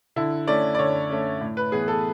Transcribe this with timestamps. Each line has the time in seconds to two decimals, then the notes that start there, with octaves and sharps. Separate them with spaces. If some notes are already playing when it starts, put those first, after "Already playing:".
0.16 D3 E4
0.47 A3 C#4 D5
0.75 D5
0.79 D3 C#5
1.10 A3 C#4
1.41 A2
1.57 B4
1.72 E3 B3 G#4
1.88 A4